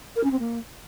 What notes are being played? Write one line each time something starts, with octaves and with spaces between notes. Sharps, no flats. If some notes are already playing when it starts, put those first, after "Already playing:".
A#4
C#4
C4
A#3